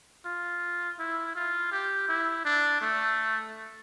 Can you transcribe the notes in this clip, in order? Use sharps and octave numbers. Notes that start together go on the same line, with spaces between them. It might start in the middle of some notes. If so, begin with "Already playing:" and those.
F4
E4
F4
G4
E4
D4
A3